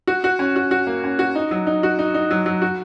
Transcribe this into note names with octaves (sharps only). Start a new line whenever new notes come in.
F#4
F#4
C#4
F#4
F#4
A#3
C#4
F#4
D#4
F#3
D#4
F#4
D#4
D#4
F#3
F#3
F#4